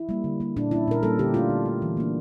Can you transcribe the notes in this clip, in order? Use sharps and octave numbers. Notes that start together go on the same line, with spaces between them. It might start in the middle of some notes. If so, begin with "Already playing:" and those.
Already playing: E4
G3 A#3
D3
G3 A#3
A#2 D4
G3 A#3 C#4 E4
A#2 A#4
G3 A#3 C#4 A4
D3 G4
A3 D4 F4
D3
A3 D4
E3
A#3 D4